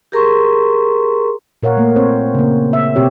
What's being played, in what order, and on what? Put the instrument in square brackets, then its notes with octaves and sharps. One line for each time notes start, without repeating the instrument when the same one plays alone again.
[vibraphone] G4 G#4 A#4 A#5 C6 C#6
[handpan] A#2 A#4 C#5 F5 F#5
A3 A#3
C4 C5 C#5
C#3 A#3
E5
B2 C4 G4 C#5